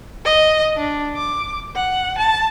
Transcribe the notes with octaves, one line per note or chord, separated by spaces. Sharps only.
D#5
D4
D6
F#5
A5